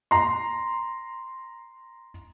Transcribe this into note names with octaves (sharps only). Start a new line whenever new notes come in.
A#5 C6